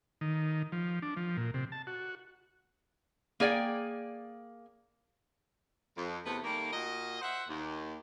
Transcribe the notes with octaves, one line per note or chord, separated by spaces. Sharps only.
D#3
F3
D4
F3
A#2
C3
A5
F#4
A#3 G#4 D5 F5 G5
F2
E2 C3 A3 B3 B4
D#3 G3 A3 A#3
A#2 F#4 D#5
C5 E5 F#5
D#2